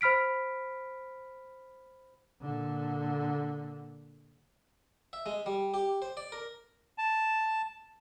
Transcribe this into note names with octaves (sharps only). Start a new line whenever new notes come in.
C5 B5 F6 B6 D7
A#2 D3
E5
G#3
G3
G4
C5
D5
A#4
A5